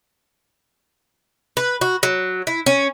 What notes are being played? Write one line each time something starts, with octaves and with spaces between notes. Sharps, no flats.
B4
F#4
F#3
E4
C#4